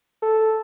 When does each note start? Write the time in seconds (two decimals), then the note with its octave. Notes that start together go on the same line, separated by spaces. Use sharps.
0.22 A4